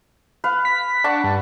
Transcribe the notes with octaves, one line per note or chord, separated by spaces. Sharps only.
B4 F5
B6
D4 F#5 A5 C#6
G2